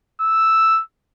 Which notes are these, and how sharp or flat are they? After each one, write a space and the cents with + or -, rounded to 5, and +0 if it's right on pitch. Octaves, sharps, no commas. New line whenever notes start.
E6 +0